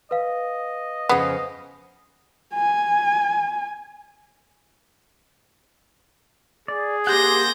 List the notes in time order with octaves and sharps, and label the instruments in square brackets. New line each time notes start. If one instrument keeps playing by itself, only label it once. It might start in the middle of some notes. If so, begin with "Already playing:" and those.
[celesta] B4 F5 [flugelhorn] D#5
[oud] F2 C#3 [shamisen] B3
[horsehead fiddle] G#5
[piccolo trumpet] G#4 [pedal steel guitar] D5
[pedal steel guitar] A#3 C5 F#5 [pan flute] G4 [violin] G6 A#6